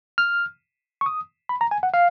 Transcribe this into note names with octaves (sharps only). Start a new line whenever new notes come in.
F6
C#6
D#6
B5
A#5
G#5
F#5
F5